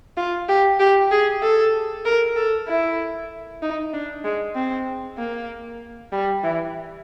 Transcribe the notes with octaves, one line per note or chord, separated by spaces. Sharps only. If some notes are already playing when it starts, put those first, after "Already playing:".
F4
G4
G4
G#4
A4
A#4
A4
E4
D#4
D4
G#3
C4
A#3
G3
E3